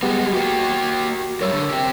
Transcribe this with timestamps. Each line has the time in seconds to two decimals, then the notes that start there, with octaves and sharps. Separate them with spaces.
0.02 G3 G#3 B3 G4 G#4
0.33 A#3 F#4 G4
1.41 F#2 G3 A#4 C#5 E6
1.52 D3
1.71 C4 G4